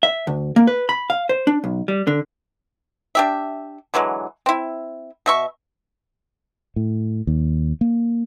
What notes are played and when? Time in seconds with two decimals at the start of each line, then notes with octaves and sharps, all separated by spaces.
0.03 E5
0.27 D2
0.56 A#3
0.67 B4
0.89 B5
1.10 F5
1.29 C5
1.47 D4
1.64 B1
1.88 G3
2.07 D3
3.15 D4 G4 E5
3.94 D3 E3 F#3 G#3
4.46 C4 E4
5.26 B2 E5 C#6
6.76 A2
7.27 D#2
7.81 A#3